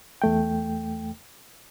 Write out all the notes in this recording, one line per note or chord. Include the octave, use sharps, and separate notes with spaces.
E2 A3 G5